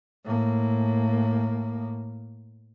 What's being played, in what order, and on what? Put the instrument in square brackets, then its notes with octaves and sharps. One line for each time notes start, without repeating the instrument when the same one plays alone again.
[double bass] A2 A#3